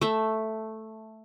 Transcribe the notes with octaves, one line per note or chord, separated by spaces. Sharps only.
A3 E5